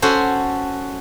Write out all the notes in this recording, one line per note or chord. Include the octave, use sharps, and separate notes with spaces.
C#4 F#4 A4 C5